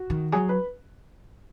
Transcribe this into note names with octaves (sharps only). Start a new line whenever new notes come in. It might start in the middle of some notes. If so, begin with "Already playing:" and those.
Already playing: F#4
D#3
F#3 G#4
B4